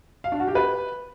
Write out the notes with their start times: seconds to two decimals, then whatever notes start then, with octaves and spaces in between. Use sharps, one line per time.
0.24 F5
0.32 D4
0.40 F#4
0.48 G4
0.55 B4